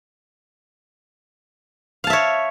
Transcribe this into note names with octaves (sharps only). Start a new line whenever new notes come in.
C#5 E5 F5 A5